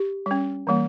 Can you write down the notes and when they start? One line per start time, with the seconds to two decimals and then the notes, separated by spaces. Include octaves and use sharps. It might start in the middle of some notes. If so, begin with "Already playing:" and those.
Already playing: G4
0.26 G3 C#4
0.67 E3 G3 A#3